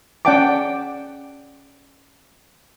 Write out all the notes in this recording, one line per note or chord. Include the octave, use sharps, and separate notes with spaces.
C#4 D5 F#5 G5 A5 D6